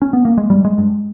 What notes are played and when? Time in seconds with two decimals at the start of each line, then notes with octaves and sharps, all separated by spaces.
0.02 C#4
0.13 B3
0.25 A#3
0.38 G#3
0.50 G2 G3
0.65 G#3
0.78 G2